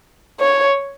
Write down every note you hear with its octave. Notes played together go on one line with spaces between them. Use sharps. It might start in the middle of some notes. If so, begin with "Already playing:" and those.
C#5